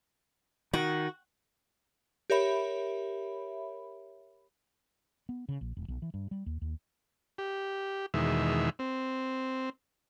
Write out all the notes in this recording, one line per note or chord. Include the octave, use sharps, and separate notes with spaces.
D#3 F#4
G4 A#4 C#5 E5 B5
B3
C#3
A#1
E1
B1
E3
G2
G3
D#2
D#2
G4
E2 B2 D#3 G#3 E5
C4